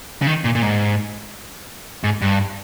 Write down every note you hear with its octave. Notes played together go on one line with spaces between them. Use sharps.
C#3
D#3
A#2
A#2
G#2
G#2
G2